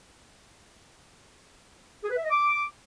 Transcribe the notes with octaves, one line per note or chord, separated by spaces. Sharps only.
G#4
B4
E5
D#5
D6